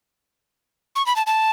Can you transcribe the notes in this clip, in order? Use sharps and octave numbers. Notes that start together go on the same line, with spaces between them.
C#6
B5
A5
A5